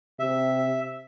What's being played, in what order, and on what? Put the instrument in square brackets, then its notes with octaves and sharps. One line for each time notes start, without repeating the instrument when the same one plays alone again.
[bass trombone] C3 [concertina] E5